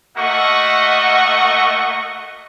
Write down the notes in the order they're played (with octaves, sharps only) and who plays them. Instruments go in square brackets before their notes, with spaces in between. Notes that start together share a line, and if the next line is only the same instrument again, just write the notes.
[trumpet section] A3 A#3 F#4 D#5 F#5 C#6